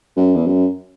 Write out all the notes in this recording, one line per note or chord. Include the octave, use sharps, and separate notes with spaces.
F#2
E2
F#2